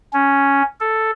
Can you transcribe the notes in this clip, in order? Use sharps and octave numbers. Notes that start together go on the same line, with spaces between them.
C#4
A4